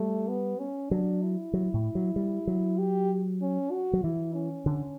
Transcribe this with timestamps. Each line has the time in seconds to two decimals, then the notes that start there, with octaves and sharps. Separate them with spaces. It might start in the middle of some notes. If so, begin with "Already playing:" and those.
Already playing: G3 A3
0.28 B3
0.60 C#4
0.90 F#3 D4
1.23 E4
1.53 F#3
1.74 A2
1.95 F#3
2.16 G3
2.47 F#3
2.78 G4
3.41 C#4
3.71 F#4
3.93 F#3
4.03 E3 E4
4.34 C#4
4.66 D3